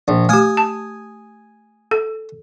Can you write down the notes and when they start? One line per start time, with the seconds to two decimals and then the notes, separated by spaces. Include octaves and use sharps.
0.08 A#1
0.29 A3 G4 G#5 D#6
0.57 A5
1.91 A4